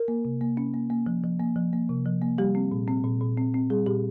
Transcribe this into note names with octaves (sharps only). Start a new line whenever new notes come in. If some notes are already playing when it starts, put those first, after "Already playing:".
Already playing: A#4
A#3
C3
A#3
C#4
A#3
A#3
F3
F3
A#3
F3
A#3
C3
F3
A#3
G3 G4
C4
A#2
C4
A#2
A#2
C4
C4
G3 G#4
A#2 G4